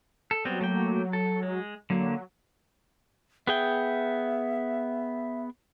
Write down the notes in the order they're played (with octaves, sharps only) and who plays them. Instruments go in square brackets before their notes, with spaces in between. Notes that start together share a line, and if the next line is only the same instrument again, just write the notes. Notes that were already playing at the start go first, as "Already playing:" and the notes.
[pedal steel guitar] A4
[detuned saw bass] F#3 [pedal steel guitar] G3 B3 C4
[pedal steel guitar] A3 A#3 G5
A4
G#3
[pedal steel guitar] D3 A#3 [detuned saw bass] F#3
[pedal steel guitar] B3 G#4 G5 [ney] E5